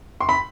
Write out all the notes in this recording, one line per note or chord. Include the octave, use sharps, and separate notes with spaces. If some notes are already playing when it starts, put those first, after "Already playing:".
C6
B5